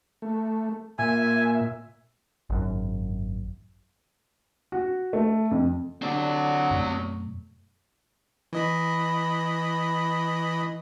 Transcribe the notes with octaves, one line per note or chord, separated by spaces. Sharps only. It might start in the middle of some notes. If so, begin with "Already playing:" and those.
A3
A#2 E5 G#5
G#1 F#2
F#4
A3
F2
D3 F#3 C4 D5
F#2 B2 A3
E3 D#5 B5